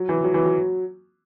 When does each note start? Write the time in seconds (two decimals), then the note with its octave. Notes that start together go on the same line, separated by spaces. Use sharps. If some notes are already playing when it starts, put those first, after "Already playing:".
Already playing: F#3
0.09 E3
0.24 F#3
0.34 E3
0.45 F#3